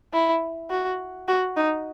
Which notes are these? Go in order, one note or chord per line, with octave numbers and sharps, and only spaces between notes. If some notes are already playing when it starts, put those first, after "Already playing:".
E4
F#4
F#4
D#4